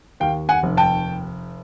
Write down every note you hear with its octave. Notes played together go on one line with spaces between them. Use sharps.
D#2 F5 G5
F#5 G#5
F1
G5 A5